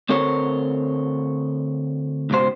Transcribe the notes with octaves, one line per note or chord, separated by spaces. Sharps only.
D2 C4 A4 A#4 C#5
C#2 G#2 B2 C5